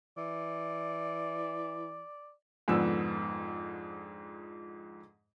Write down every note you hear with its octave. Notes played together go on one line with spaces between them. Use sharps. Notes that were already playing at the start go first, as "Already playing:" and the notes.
E3 D5
F2 G#2 D3 F3 B3 E6